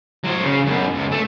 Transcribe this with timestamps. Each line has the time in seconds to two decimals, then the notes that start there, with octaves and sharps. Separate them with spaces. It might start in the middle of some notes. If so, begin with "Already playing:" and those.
0.24 F#3 C5
0.44 C#3
0.66 F#2 B2
0.95 C#2
1.12 A3